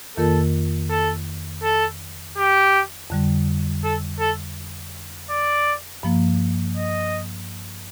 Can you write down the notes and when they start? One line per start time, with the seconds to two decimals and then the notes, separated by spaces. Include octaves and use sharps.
0.17 F2 D#3 A#3 F4 A4 A#4
0.90 A4
1.63 A4
2.38 G4
3.10 F2 D3 G3
3.84 A4
4.20 A4
5.30 D5
6.03 G2 F3 A#3
6.77 D#5